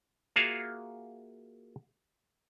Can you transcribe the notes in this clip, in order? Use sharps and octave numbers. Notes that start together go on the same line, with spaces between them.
A#3 F4 F#4 G#4 E5 F5